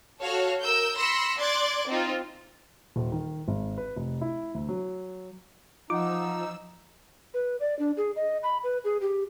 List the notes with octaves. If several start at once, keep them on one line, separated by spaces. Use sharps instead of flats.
F#4 A4 C#5 F5
A#4 E6 G6
B5 C6 E6 A#6 C7 C#7
D5 C6 D6 F#6 G#6 A6
C4 D#4 F4
D#1
D#3
G#1
B4
F1
E4
D2
F#3
F3 D#4 F4 F#5 D6 E6
B4
D5
D4
G#4
D#5
B5
B4
G#4
G4